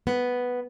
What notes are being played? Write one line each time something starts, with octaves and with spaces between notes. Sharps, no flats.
B3